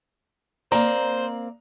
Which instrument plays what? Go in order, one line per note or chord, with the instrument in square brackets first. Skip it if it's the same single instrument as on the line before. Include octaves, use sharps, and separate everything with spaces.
[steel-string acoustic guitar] A#3 C4 D5 [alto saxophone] C5 [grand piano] A#5